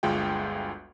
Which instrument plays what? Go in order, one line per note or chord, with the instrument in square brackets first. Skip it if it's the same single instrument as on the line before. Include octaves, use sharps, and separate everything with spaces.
[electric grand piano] G1 D2 G#3 F4 G#4 G5